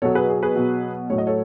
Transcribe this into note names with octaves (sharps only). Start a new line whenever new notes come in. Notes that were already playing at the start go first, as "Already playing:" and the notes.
B2 F#3 A4 C#5
G#4 B4
G#4
G#4 B4
B2 F#3
A2 F#3 C#5
D#5
A4 C#5